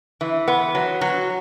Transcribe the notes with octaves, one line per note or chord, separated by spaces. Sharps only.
E3
B3
F#3
F#3